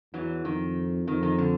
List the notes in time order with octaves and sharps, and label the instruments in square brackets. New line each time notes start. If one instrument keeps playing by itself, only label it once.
[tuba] E2 [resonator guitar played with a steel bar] E3 F#3
[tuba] F2 [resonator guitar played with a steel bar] D#3
[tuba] F2 [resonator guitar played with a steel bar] D#3
[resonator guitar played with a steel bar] D#3
D3